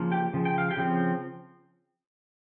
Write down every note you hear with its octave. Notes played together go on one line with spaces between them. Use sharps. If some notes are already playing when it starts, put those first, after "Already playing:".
Already playing: C#3 F3 A#3
G4 G5
C#3 F3
G5
F5
G4 G5
C#3 F3 C4